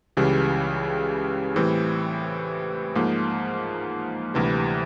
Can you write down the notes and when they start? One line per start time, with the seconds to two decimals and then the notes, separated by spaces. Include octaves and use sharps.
0.17 C#2 C#3 E3 G3
1.56 A2 E3 G3 C4
2.95 G#2 F3 A#3
4.34 D2 C3 E3 G3